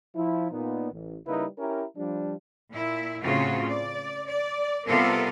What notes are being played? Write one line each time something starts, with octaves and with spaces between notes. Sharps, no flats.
F3 E4
A#2 B3 D#4
A1
C#3 G3 A#3 D#4 E4 B4
C#4 E4 G4 A#4
F3 G3 D4
A#2 E4
A2 C#3 C4 F4 F#4
D5
D5
C3 G3 B3 F4 A4 A#4